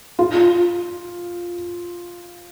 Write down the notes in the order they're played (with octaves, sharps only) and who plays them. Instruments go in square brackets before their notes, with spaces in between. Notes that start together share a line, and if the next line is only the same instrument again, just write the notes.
[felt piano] F4